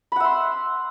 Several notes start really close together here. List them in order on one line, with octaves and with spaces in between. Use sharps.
B5 F#5 E5 C6